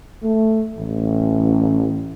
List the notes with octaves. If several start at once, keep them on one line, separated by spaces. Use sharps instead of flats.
A3
A1